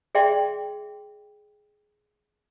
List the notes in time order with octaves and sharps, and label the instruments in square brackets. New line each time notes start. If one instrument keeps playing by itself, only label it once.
[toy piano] G#4 D5 E5 G5 C6